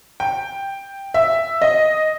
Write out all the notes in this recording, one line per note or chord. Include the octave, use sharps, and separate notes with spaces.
G5
E5
D#5